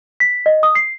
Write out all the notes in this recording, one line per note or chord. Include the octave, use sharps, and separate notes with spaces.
B6
D#5
D#6
C7